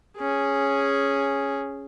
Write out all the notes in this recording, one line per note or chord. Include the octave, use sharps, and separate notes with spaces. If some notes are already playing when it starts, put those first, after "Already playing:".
C#4 G#4